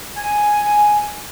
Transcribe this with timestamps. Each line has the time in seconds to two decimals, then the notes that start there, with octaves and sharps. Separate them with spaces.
0.17 G#5